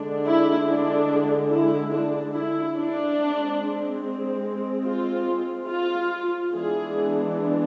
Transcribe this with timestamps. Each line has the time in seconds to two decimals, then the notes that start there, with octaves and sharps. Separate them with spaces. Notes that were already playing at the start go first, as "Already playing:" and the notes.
Already playing: D3 G#3 D4
0.26 E4
0.68 D4
1.52 E4
1.93 D4
2.36 E4
2.77 D4
3.18 G#3
3.23 C4
4.86 F4
5.68 F4
6.52 E3 G#3 B3 D4 G#4